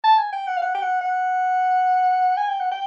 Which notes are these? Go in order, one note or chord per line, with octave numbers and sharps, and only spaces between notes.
A5
G#5
G5
F#5
F5
F#5
G5
F#5
F#5
G#5
G5
F#5
G5